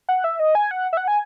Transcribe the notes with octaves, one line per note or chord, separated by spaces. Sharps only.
F#5
E5
D#5
G#5
F#5
E5
F#5
G#5